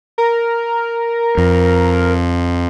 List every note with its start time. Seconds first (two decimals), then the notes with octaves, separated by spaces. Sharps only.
0.18 A#4
1.37 F2